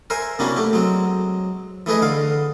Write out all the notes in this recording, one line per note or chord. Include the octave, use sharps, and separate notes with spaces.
A#4 C5 E5 G#5
C3 A#3 C#4 D4 E4 F#4
A3 G4
F#3 G#3 C4
E3 A3 G#4 B4 D#5
D3 F5